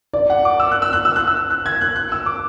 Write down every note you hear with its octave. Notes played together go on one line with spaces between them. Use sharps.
D5
F#5
D6
E6
F#6
E6
F#6
E6
F#6
E6
F#6
G#6
F#6
F#6
E6
D6